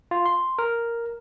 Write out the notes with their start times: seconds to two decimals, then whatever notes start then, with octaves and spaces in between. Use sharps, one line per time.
0.11 F4
0.26 C6
0.59 A#4